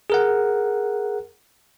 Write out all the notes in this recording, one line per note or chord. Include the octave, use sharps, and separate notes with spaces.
G#4 A#4 F#5